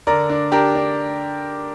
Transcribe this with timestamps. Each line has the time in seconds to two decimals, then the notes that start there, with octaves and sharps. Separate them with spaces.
0.07 D3 A#4 D5
0.30 D4
0.52 D4 G4 A#4
0.75 D4